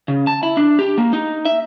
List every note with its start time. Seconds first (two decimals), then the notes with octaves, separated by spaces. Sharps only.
0.08 C#3
0.27 A5
0.43 E4
0.57 D4
0.79 G4
0.98 A#3
1.13 D#4
1.45 E5